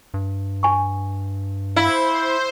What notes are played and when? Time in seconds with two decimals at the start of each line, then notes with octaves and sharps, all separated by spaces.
0.14 G2
0.63 G#5 C#6
1.76 E4 C5 F5